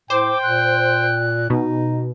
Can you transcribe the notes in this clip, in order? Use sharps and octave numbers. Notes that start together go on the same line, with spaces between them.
A2 C5 G5 D6
A#2 F#6
B2 D#4